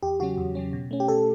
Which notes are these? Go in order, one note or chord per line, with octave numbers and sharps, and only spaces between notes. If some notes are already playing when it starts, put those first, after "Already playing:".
E2 G4
C#3 F#3 C#4 F#4
E2
C#3 F#3 C#4
B2
A3 C#4
G4
B2 A4